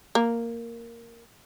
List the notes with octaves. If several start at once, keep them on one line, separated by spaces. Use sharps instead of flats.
A#3